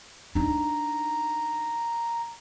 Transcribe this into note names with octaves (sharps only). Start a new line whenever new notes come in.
D4 D#4 A#5